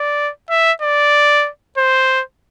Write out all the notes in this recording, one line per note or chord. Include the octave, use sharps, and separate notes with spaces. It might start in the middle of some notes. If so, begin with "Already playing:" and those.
Already playing: D5
E5
D5
C5